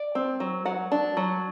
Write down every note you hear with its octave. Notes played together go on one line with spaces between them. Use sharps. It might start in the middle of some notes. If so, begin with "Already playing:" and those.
Already playing: D5
C4
F#3
F#3 F#5
D4
F#3